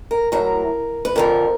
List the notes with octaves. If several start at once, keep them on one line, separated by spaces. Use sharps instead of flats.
A#4
A2 F#3 A#4
B4
F2 D3 F3 A#4